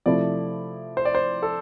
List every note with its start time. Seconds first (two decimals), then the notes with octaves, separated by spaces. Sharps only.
0.06 C3 F3 A3 E4 D5
0.97 C5
1.05 D5
1.15 C5
1.42 A4